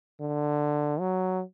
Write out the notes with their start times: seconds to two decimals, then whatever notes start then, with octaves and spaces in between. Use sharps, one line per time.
0.20 D3
1.00 F#3